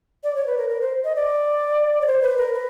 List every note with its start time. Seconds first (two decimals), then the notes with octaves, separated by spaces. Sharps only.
0.24 D5
0.35 C#5
0.47 B4
0.57 A#4
0.70 A#4
0.81 C5
1.04 D#5
1.15 D5
2.01 C#5
2.07 C5
2.22 B4
2.37 A#4
2.53 B4